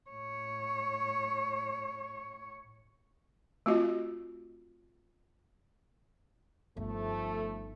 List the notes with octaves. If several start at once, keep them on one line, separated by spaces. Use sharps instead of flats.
A2 C#5
A3 C4 F4 F#4 D#5
G1 F3 A3 D#4